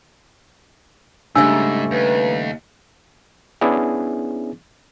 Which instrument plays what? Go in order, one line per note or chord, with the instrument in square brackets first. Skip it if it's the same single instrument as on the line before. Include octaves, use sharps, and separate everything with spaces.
[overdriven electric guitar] G#2 [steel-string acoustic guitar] C#3 G3 A3 [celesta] D4 G#5 E6
[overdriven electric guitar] D#2 [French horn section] B4
[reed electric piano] B3 C#4 D4 E4 G#4